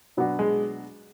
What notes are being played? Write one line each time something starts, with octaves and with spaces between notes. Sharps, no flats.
B2 F#3 B3 D4 F#4
G#3